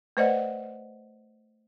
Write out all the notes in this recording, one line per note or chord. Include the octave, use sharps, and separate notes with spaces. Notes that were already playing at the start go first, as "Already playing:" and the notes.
A3 B4 C5 D5 D#5 F#5